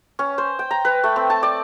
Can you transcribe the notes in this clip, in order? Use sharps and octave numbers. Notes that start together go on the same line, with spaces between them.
C#4
C5
G5
A#5
B4
A3
C4
A5
D5